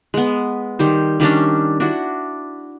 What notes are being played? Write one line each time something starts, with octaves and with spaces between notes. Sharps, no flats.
G#3 B3
D#3 G3 C5
D#3 G3 C#4 D4
D4 E4 F#4